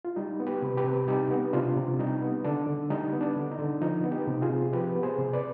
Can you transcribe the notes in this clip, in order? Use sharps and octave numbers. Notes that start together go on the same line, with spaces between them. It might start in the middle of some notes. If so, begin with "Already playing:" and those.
F4
G3 D#4
B3
G4 B4
C3
G4 B4
C3
G3 D#4 G4
B3
C3 D4 F4
C3
G3 D#4
B3
D3 D4
D3
G3 D#4
B3
D4
D3
D#4
D3
F3 D#4
B3
D#4 G4
C3
F4 G#4
C3
F3 G4 B4
B3
G#4 C5
C3
B4 D5